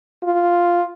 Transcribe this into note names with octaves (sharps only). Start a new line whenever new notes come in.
F4